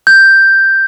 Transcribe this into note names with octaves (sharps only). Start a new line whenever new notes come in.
G6